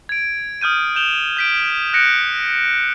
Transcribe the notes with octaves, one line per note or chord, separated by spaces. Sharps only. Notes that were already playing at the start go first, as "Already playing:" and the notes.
G#6 D7
D#6 F6 G6 D#7
G6 E7 F7 G7
G6 B6 D7
F#6 A#6 C#7 D7